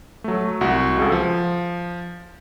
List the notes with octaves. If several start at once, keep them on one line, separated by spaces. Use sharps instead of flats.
F#3 A3
C2 F#4
C#2 G#4 A4
F3